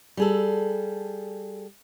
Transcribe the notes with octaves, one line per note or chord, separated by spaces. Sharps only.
G3 G#4 A4